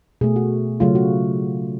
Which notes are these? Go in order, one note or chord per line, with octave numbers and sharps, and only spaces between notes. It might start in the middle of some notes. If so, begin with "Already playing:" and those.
B2 A3 G#4
F#4
C#3 F#3 A3 F4
F#4